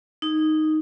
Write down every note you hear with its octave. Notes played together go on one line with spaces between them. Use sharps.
D#4